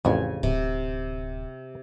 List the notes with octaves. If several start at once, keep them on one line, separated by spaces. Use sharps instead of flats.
A1 F2 C#3 G#5
D1 C3